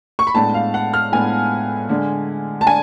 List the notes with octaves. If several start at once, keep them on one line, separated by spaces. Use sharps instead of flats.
C#6
B5
A2 G#3 B3 D4 A5
F5
F#5
F6
A2 G#3 B3 D4 G#5
D3 G#3 D4
A5
D4 G#5